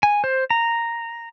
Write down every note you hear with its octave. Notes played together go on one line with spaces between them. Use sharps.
G#5
C5
A#5